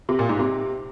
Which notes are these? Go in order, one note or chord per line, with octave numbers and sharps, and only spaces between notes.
C3
A#2
G#2
C3